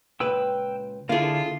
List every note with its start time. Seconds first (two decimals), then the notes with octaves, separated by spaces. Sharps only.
0.20 C#2 A#2 B4 G5 E6
1.09 D3 A#3 E4 F4 G#4 A4 F5